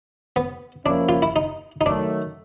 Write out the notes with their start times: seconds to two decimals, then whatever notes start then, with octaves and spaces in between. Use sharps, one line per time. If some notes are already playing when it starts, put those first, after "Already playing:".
0.36 B3
0.85 F3 A#3 C#4 D4 E4
1.09 F4
1.22 E4
1.36 D#4
1.81 D#4
1.86 D#3 F#3 A3 D4